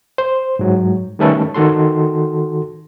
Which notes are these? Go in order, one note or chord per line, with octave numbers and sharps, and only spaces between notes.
C5
G#2 F#3
D#3 G3 A3 C#4 A4 B4
D#3 F#4 A4 C6